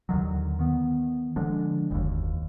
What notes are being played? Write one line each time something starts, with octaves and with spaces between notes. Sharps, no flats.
D#2 D3 D#3 F#3
D#3 B3
D3 F3 G#3 D4
F#1 D#2